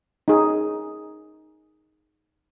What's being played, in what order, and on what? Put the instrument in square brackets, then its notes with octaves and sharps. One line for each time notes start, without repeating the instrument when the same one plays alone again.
[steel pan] D#4 G#4